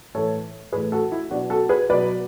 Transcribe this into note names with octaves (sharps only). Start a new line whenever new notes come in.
A2 E3 A3 A4 C#5
A2 E3 A3 G#4 B4
F#4 A4
E4
B2 F#3 B3 D4 F#4
F#4 A4
G#4 B4
B2 F#3 B3 B4 D5